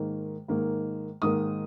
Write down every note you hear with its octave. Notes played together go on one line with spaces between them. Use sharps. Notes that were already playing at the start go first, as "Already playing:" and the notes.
Already playing: G#2 D#3 A#3
G#2 D#3 A#3
G#2 D#3 A#3 D#6